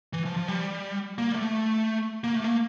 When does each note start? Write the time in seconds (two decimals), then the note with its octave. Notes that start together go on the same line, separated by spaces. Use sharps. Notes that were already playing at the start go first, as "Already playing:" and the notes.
0.13 E3
0.25 F3
0.37 F3
0.48 G3
1.18 A#3
1.32 G3
1.36 A3
2.24 A#3
2.35 A3
2.44 A#3